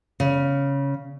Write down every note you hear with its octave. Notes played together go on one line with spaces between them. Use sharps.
C#3